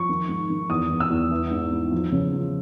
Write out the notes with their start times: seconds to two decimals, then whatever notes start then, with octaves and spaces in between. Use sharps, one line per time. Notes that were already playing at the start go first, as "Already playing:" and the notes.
Already playing: F3 C#6
0.09 D#3
0.29 G#2
0.50 D#3
0.70 E2 D#6
0.90 E2
1.00 E6
1.10 E2
1.31 E3
1.51 G#2
1.72 G#2
1.92 F3
2.12 C#3
2.33 F3